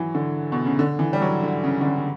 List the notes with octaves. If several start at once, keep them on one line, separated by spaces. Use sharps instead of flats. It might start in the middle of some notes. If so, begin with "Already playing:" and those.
Already playing: E3 F#3
D3
B2
C#3
D3
E3
G3
F#3
D3
C#3
D3
C#3
C#3